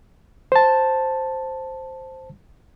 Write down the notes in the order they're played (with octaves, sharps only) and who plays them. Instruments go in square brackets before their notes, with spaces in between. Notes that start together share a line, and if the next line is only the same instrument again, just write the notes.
[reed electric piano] C5 A5